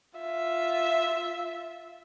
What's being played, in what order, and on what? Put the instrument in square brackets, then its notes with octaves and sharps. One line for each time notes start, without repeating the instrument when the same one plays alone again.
[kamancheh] F4 E5